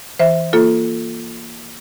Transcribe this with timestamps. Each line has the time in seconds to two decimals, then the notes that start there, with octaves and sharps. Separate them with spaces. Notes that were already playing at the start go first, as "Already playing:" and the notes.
0.19 E3 C5 E5
0.53 A#3 F4 A4